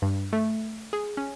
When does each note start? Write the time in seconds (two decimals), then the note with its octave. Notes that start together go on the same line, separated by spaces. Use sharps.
0.02 G2
0.33 A3
0.93 G#4
1.17 C#4